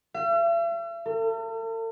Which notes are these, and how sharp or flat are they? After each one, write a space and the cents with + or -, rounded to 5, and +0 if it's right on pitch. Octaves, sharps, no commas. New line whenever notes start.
E5 +45
A4 +45